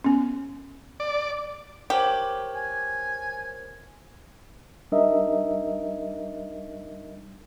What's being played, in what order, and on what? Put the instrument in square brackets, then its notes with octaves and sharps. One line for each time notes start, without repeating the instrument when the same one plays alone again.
[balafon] B3 C#4
[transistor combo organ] D5
[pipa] G4 [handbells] A#4 C5 C#5
[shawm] G#5
[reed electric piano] G3 D4 D#4 A#4 D#5 E5